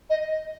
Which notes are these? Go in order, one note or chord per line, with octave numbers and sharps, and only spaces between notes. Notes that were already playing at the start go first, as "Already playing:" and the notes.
D#5